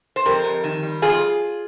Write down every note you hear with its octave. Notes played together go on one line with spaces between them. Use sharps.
C5
F2 G4 A#4
F2
D#3
G3
F2 F4 G#4